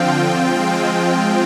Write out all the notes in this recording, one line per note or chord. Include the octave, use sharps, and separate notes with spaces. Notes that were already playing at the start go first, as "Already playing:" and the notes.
Already playing: D3 F3 C4 F4 G5
F3 G#3 C4 F4